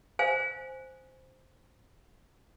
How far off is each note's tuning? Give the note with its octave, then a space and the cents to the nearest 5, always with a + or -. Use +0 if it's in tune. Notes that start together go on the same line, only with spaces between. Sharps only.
C5 +0 F5 +0 G#5 +0